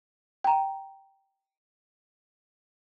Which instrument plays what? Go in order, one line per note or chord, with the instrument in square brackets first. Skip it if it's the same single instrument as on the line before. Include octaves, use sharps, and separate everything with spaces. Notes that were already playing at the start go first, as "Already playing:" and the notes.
[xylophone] G5 A#5